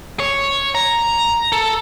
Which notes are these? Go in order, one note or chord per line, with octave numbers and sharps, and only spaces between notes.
C#5
A#5
A4